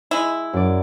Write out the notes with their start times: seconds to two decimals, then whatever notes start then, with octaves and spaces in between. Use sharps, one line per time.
0.11 G#3 E4
0.53 F#2 D5